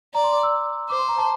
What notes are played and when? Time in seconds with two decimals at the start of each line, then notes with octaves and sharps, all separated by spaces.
0.14 D5 A#5
0.24 C6
0.33 D6
0.43 E6
0.90 C5 D6
0.99 C6
1.08 A#5
1.18 A5